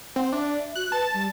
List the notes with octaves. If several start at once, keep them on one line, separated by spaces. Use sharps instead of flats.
C4 F#5
D4 E5
F#4 F#6
B4 A5
G3